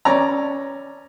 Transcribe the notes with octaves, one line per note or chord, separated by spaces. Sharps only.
C#4 D5 A#5